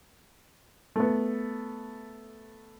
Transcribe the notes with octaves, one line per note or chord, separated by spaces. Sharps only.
A3 B3